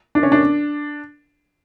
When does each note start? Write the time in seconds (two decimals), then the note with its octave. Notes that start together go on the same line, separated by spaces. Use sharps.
0.15 D4
0.23 C#4
0.32 D4